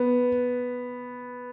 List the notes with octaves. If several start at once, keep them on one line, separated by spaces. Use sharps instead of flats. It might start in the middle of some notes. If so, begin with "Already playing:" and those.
Already playing: B3